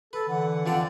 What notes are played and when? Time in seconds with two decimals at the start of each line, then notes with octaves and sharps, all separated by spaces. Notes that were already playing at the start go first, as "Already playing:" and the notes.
0.13 A4 B4
0.28 D3 E3 F#5
0.66 F2 D3 C4 D5